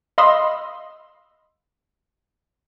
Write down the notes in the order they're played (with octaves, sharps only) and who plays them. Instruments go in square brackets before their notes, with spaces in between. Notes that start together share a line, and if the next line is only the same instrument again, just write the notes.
[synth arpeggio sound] D#5 F5 B5 C6 D#6 E6